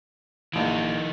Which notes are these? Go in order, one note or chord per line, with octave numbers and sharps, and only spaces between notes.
A#1 E3 D#4 D7